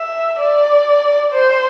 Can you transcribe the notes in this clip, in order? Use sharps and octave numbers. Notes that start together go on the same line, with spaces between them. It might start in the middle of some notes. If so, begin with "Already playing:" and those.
Already playing: E5
D5
C5